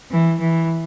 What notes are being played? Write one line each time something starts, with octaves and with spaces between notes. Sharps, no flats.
E3
E3